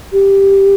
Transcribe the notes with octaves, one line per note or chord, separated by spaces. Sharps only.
G4